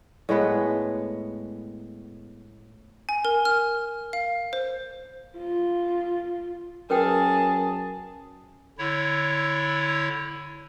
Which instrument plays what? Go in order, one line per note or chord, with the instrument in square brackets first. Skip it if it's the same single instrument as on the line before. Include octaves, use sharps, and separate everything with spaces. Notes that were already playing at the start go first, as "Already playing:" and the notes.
[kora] A2 G#3 B3 B4
[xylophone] G#5
A#4
F6
F5
C5
[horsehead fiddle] F4
[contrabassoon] F#2 [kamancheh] G#4 A5 [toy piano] A#4 B4 G5
[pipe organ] D3 E4 C#5